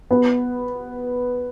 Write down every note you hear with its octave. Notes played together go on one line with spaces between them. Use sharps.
B3